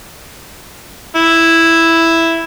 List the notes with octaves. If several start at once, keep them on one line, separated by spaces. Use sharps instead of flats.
E4